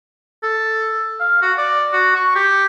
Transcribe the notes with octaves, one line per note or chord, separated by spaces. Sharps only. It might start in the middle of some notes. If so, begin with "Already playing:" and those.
A4
F5
F#4
D5
F#4
C#6
G4